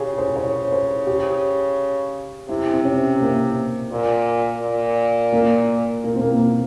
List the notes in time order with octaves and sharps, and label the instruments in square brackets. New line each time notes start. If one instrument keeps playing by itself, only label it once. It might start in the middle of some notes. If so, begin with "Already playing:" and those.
Already playing: [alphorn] C#3 [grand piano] G4 G#4
[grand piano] C5
C#5
C5
G4
[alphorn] C3 [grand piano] E4
[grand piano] C4
C#4
A#3
[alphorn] A#2
A#2
[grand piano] A#3
A#3
C4
A#3
A#3